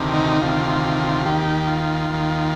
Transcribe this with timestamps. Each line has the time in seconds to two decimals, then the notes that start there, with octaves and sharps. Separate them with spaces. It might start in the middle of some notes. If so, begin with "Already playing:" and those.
Already playing: D2 C3 D#3
0.14 D#4
0.41 D2 C3 D#3 F4
1.26 D#2 D#3 G4
1.67 F4
2.10 D#2 D#3